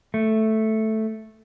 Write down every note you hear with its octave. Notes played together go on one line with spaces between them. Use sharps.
A3